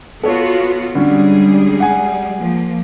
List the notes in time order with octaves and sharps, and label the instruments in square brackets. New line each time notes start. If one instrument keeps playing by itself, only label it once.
[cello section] B3 F4 F#4 [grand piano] A4 C#5
[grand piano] D3 C#4 [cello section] G3 G#3 G#4
[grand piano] F#5 G#5
[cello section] F3 A#3